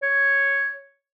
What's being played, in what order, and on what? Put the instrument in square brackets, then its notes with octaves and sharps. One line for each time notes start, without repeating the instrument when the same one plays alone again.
[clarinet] C#5